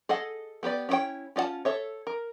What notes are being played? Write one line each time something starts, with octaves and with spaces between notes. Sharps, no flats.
G#4 A4 D#5 F#5
B3 G4 B4 D5
C#4 E4 A#4 C#5 G5
C#4 F4 D#5 F#5 A5
A4 C#5 E5
A#4